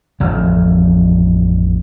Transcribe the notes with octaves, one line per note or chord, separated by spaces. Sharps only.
A1 F2 F3